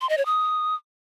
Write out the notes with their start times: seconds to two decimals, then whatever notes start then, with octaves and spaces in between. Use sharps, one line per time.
0.01 C6
0.09 D#5
0.18 C#5
0.26 D#6